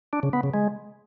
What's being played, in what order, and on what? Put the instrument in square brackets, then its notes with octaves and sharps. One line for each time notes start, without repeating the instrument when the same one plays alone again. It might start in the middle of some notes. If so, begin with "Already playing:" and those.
[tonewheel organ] D4
C#3
B3
C#3
G#3